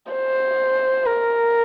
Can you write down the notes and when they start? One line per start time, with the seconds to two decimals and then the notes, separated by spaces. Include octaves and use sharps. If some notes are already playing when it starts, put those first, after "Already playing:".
0.12 C5
1.06 A#4